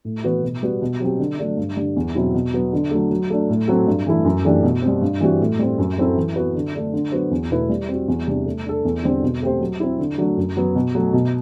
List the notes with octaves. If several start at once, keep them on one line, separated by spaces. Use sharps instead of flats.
A2
E3 B3 F#4 B4
B2
G3 B3 F#4
B2
F#3 C4 G4
D3
F#3 A3 D4
G2
D3 G3
E2
B2 F#3 C4 E4
B2
F#3 B3
D3
F#3 A3
F#3
A3 D4
A2
F#3 C4 F#4 A4
G2
E3 A3 E4
F#2
E3 A3 D4 G4
B2
C4
G3
G2
E3 G3 C4 F#4
A2
G3 C4
F#2
F#3 C4 E4 A4
E3
B3 F#4 B4
D3
A3 D4
D3
F#3 B3 F#4 C5
E2
B2 A3 E4 B4
G3
C4 F#4
E2
C3 G3 D4
A3
D4 A4
E2
D3 G3 C4
B2
A3 C4 G4 C5
F#3
C4 E4
D3
F#3 A3 D4 F#4
F#2
F#3 B3
B2
F#3 A3
B2